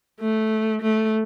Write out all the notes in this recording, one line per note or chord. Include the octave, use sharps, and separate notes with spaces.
A3
A3